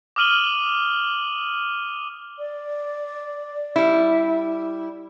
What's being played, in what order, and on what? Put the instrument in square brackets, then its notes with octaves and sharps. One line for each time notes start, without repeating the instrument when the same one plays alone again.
[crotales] D6 D#6 F6 D#7 F#7 G7
[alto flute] D5
[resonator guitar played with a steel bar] G3 E4